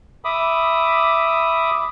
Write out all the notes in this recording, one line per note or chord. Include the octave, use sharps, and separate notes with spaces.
E5 B5 D6 D#6